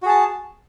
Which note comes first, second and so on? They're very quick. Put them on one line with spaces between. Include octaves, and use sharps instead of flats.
F#4 G#4 A5